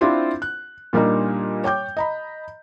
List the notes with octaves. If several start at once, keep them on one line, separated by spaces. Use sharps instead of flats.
C4 D4 E4 F4 C5
F#6
A#2 G3 A#3 D4 D#4
C#5 G5 D6 G6
D#5 A#5 B5